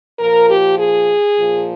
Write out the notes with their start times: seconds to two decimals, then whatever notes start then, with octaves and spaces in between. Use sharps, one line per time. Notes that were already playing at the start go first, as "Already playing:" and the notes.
0.19 A#2 F3 A#4
0.50 G4
0.78 G#4
1.39 A#2 F3